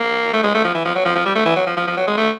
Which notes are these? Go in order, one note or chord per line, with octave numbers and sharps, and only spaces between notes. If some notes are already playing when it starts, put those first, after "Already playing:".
Already playing: A#3
A3
G#3
A3
F3
E3
F3
F#3
F3
F3
G3
A3
E3
F#3
F3
F3
F3
F#3
G#3
A3